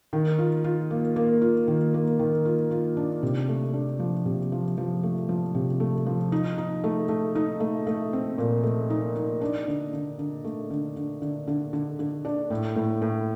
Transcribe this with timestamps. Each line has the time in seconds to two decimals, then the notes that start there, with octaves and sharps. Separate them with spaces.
0.13 D#3
0.38 F4
0.64 F4
0.91 A#3
1.16 A#3
1.42 F4
1.68 D#3
1.94 A#3
2.19 D#3
2.45 F4
2.71 F4
2.97 D4
3.23 C3
3.48 A3
3.74 D4
3.99 F3
4.25 C3
4.52 F3
4.78 F3
5.03 A3
5.29 F3
5.55 C3
5.80 A3
6.06 F3
6.32 D#4
6.58 D#4
6.84 A3
7.09 A3
7.35 D#4
7.60 A3
7.87 A3
8.13 C4
8.38 A#2
8.63 A3
8.90 D#4
9.15 D#4
9.41 D4
9.67 D3
9.93 D3
10.19 D3
10.44 A3
10.70 D3
10.96 D3
11.22 D3
11.47 D3
11.73 D3
11.99 D3
12.25 D4
12.50 A2
12.76 A2
13.02 A2